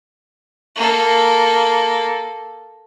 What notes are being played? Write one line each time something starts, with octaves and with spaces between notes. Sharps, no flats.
A#3 A4